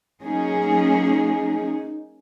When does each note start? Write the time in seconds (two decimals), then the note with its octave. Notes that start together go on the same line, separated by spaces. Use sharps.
0.22 F#3 A#3 C#4 D#4 G#4
0.66 D#4
1.09 D#4